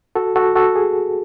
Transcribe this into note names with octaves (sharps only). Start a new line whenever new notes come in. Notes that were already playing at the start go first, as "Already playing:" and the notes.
F#4 A4
F#4 A4
F#4 A4
G#4